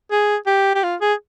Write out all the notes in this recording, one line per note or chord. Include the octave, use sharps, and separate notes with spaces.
G#4
G4
G4
F4
G#4